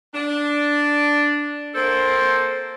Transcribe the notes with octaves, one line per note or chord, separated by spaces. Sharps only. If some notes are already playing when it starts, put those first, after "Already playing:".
D4
A#3 C4 A4 C5